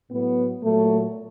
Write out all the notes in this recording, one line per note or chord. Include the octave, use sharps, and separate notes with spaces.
A2 F#3 B3
A#2 F#3 A3